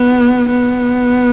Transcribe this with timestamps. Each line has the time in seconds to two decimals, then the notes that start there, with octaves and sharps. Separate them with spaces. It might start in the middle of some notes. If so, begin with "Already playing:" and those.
Already playing: B3
0.49 B3